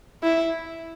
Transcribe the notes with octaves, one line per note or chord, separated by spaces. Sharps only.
E4